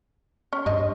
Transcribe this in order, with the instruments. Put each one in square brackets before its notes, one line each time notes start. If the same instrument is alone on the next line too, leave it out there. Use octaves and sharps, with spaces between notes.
[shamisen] C#4
[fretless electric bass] G2 [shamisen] C5 D#5